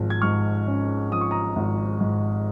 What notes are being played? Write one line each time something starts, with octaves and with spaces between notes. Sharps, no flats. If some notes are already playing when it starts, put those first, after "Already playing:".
Already playing: G#1 F3
G#6
G#2 C#6 F6
C#4
F3 D#6
C#6
A#5 D#6
G#1
G#2